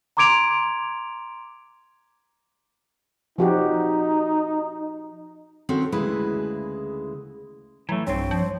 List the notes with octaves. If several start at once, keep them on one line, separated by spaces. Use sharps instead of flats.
A#5 C6 D6 G#6 D7 F7
F3 D#4 F#4 G4
D#3 C4 C#4 F#4 A4
D2 C#3 G#3 E4 B4
E3 F#3 A3
B1 G2 C4 C#5
F3